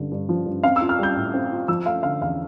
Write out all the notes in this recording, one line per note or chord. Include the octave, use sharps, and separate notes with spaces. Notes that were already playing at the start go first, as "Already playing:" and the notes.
Already playing: G2 D3
G2
F3
G2
C4 F5
F4 E6
F6
G3 G6
A2
C4
F4
F3 E6
A3 F5
D3 F5
E2 F5